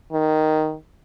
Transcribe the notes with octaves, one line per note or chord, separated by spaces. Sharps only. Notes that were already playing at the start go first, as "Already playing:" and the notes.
D#3